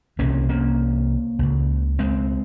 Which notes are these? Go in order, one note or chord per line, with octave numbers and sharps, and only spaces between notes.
C2 C3 A#3 C#4
A#3 C#4
C#2 C#3
G#3 C4